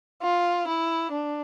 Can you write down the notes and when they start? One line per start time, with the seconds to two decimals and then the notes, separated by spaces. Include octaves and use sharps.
0.22 F4
0.67 E4
1.11 D4